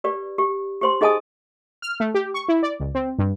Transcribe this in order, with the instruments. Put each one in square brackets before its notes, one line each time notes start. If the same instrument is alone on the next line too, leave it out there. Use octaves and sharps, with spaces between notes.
[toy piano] G4 B4 D5
G4
G4 C5 C6
D#4 G#4 D#5 G#5 A5 D#6
[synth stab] F6
A3
G4
C#6
E4
D5
C#2
C4
G2